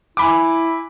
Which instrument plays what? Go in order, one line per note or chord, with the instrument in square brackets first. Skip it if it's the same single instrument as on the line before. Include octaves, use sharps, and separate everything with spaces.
[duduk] E4 [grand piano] G#5 B5 D6